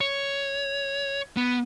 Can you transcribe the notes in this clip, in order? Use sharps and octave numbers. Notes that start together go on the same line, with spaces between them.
C#5
B3